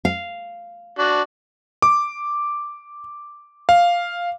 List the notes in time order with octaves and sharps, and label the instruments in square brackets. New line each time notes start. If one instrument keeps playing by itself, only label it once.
[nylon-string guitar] F5
[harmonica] D4 F#4
[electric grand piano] D6
F5